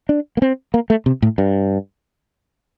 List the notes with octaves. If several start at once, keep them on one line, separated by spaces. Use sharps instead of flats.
D4
A#3
C4
A#3
A3
C3
A2
G2